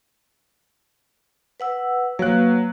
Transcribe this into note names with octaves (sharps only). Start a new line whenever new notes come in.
B4 F#5 E6
F#3 A#3 B4 F5 F#6